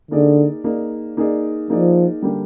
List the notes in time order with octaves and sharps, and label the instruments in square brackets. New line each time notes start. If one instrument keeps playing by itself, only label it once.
[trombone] D3 [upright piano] A#3 D#4 G#4 D5
[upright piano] A#3 D#4 G#4 D5
A#3 D#4 G#4 D5
[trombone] F3 [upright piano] A#3 D#4 G#4 D5
[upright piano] D3 G3 A#3 D4 G4